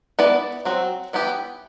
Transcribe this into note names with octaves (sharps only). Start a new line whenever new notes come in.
B3 E4 B4 D5
F#3 C4 F#4
E3 B3 E4 G4